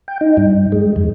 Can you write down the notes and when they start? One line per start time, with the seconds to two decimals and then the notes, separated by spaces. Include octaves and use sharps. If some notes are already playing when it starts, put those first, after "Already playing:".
0.08 G5
0.21 D#4
0.37 G2
0.72 G#3
0.96 F2